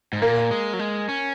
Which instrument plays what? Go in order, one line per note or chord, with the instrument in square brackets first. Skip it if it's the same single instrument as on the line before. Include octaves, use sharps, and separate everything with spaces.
[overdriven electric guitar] G#2
[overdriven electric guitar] A#2 [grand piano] A#3
[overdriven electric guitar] G#3
F#3
G#3
C#4